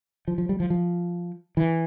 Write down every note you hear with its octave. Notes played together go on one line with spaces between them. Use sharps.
F3
F3
G3
F3
F3
E3